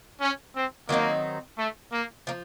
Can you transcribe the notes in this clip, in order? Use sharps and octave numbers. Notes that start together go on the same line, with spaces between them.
C#4
C4
D#3 F#3 A#3 C4 D#4
A3
A#3
F3 A#3